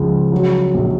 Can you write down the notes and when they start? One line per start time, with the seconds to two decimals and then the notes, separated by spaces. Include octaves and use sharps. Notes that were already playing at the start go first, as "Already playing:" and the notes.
Already playing: C#2 F3
0.32 F#3
0.75 A#1